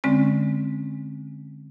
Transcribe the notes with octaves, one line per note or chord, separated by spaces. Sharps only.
D3 G#3 C4 C#4